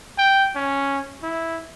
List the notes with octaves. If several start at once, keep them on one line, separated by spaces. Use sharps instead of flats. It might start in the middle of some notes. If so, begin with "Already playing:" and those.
G5
C#4
E4